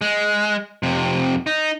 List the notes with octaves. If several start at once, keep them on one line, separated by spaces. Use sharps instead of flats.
G#3
F2 C3
D#4